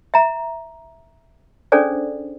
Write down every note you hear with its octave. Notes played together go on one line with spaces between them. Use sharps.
E5 A#5
C#4 D4 G#4 A4 C5 D5